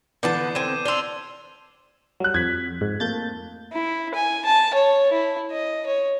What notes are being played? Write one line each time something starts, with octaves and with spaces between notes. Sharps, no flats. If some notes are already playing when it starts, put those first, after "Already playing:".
D3 E3 B3 B4 A5 D6 G6 C7
D3 C4 G#6 D#7 E7
D4 C5 E6 F7 G7
F#3 G3 F#6
F2 G#6 B6
G#2
F2 A3 A#3 G6 A6
E4
G#5
A5
C#5
E4
D#5
C#5